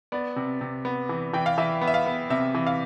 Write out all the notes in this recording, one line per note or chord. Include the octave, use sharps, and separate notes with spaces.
B3 D5
C3
C3
B3
E3
E3 G5
F5
E3 E5
B3
E5
F5
B3
C3 E5
E3
F5